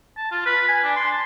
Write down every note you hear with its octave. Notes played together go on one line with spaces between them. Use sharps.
A5
F4
B4
G#5
D4
C6
A5